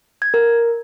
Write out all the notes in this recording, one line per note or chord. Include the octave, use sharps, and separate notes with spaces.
G#6
A#4